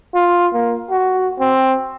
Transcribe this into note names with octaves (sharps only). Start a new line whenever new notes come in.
F4
A#3
F#4
C4